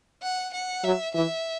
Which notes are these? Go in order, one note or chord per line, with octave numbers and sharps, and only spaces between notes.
F#5
F#5
F#3 E5
E3 E5